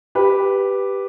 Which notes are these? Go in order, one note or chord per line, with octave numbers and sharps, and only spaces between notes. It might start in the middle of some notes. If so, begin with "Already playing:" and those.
G4 B4